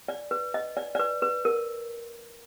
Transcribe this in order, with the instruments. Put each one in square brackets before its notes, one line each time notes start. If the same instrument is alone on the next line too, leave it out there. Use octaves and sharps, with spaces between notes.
[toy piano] D5
B4
D#5
D5
D5
B4
B4
A#4